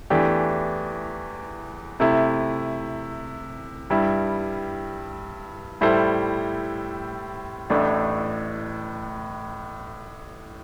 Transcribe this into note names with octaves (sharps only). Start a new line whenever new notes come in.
E2 E3 A3 D4 G4
C3 A3 E4
G2 G3 E4
A2 G3 E4 A4 C5
A1 A2 A3 D4